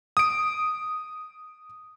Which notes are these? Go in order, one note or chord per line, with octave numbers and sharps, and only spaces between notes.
D#6 D7